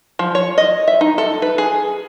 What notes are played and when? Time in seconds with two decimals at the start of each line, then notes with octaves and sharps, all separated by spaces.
0.19 F3
0.35 C#5
0.58 D#5
0.88 E5
1.01 D#4
1.18 A4
1.42 B4
1.58 G#4